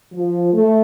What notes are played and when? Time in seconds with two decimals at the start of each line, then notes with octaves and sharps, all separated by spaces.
0.14 F3
0.53 A3